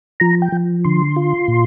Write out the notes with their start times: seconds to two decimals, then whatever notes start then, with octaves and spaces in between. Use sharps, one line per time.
0.20 F3 A#5
0.42 G5
0.52 F3
0.84 D3 C6
1.16 F4
1.48 A#2